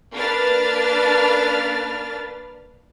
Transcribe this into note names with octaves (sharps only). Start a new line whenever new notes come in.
A#3 D4 B4 F6 A6